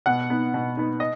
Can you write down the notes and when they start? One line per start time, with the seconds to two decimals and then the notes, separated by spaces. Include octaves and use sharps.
0.06 B2 F#5
0.30 B3 D#4
0.54 B2
0.77 B3 D#4
1.00 D#5